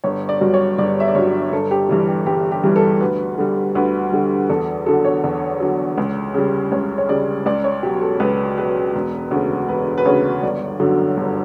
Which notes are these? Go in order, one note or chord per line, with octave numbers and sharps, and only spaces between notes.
G1 C#5
D5
G2 F#3
C#5
G1 D5
E5
D5
G2 F#3 C#5
G1 A4
G4
G2 E3 G3
G4
G1 G4
G4
G2 E3 G3
A4
D2 B4
D3 G3
D2 B4
D3 G3
E2 A4
D3 F#3 A4
C#5
E2
D3 F#3
C#2
C#3 G3
C#2 C#5
C#5
C#3 G3 D5
C#2 D5
C#5
B2 F#3 G4
A4
C#2 B4
B2 F#3 B4
E1
D2 C#3
E1 B4
B4
D2 C#3 C#5
G1 D5
F#2 D3 F#3
G1